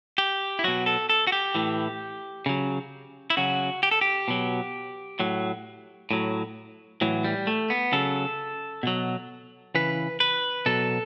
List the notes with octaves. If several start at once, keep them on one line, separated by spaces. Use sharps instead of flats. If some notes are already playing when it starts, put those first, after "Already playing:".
G4
E4
B2 F#3 F#4
A4
A4
F#4
G4
A2 E3
C#3 F#3
E4
C#3 F#3 F#4
G4
A4
G4
B2 F#3
A2 F#3
A2 F#3
A2 E3 F#3
G3
A3
B3
C#3 F#3 A4
B2 F#3
C#3 E3 B4
B4
B2 F#3 A4